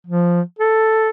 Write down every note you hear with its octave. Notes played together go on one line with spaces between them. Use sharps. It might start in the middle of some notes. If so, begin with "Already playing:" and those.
F3
A4